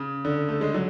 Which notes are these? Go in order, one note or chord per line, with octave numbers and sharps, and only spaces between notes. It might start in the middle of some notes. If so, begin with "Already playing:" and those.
Already playing: C#3
D3
A3
G#3
D3 F#3